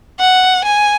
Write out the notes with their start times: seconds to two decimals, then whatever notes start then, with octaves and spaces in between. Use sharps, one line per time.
0.20 F#5
0.65 G#5